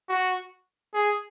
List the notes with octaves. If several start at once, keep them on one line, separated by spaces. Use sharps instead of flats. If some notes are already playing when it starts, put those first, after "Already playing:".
F#4
G#4